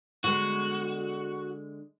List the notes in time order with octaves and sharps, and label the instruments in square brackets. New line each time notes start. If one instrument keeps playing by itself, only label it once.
[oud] D3 G#3 B3 [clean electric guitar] F#4